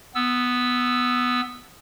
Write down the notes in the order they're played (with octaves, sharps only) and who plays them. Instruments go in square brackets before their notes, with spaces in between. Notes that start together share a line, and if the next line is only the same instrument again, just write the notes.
[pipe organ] B3 E6